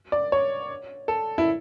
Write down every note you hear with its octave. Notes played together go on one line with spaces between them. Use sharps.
D5
C#5
A4
E4